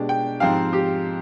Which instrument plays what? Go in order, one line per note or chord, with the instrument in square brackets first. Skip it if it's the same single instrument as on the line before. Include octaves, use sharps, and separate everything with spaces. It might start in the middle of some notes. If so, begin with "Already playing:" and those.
Already playing: [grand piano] B2 G#3 D4 G4
[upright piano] G5
[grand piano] G#2 F3 C4 G4 [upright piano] F5
[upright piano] G4